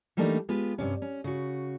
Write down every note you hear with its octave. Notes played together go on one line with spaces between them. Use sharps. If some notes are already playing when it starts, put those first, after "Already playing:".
E3 G3 A3 A#3 D4 D#4
G#3 B3 F4 G4
G2 C3 C#4
C#4
C#3 F#4